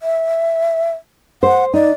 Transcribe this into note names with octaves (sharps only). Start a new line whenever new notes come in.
E5
C5 F#5
D#4 D5